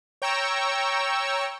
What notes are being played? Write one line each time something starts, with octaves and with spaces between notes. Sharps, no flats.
C#5 G5 A#5 C#6 E6